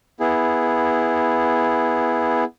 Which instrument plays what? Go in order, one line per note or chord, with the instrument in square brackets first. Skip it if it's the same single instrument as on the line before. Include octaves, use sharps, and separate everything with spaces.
[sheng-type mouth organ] B3 E4 G#4